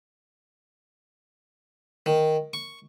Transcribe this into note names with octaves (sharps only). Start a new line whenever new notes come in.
D#3
C#6